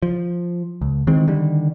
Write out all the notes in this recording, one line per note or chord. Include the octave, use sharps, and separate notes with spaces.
F3
C#2
D#3 E3 G#3 C4
D3 D#3 G3